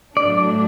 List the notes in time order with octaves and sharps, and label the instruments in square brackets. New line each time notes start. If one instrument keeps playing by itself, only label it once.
[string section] A2 F#3 A3 D4 [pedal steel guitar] D5